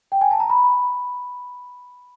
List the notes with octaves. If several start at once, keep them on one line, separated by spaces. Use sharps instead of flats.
G5
G#5
A5
A#5
B5